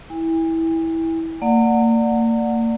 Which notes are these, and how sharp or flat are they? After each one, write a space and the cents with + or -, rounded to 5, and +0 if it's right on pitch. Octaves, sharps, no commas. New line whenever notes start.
E4 -15 G#5 -45
A#3 -35 D5 +0 F#5 -10